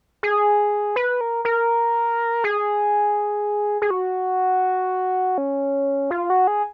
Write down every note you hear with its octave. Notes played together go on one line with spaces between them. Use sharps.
G#4
B4
A#4
A#4
G#4
G#4
F#4
C#4
F4
F#4
G#4